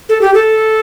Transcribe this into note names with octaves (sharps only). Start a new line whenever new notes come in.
A4
G4
A4